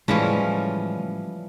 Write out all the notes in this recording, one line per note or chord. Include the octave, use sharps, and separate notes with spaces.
A2 C#3 E3 F3 G3 G#3 C#4